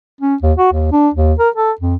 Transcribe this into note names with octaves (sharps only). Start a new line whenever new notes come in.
C#4
D#2
F#4
D#2
D4
D#2
A#4
A4
F2